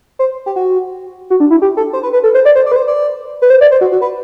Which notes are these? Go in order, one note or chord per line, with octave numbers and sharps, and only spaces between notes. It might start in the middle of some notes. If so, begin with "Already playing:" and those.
C5
G4
F#4
F#4
D4
E4
G4
A4
C5
B4
B4
A4
C5
D5
C5
D5
B4
C5
D5
B4
C5
D5
C5
F#4
F#4
B4